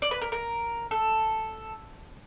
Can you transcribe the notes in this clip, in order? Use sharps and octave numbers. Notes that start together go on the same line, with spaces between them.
D5
B4
A#4
A#4
A4